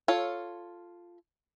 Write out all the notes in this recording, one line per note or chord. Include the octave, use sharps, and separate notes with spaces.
F4 A4 C#5